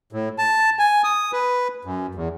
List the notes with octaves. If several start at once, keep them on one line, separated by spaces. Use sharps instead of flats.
A2
A5
G#5
D#6
B4
F#2
E2